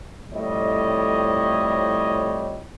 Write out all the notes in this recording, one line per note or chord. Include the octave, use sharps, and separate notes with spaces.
F2 A2 G3 E4 C#5 D#5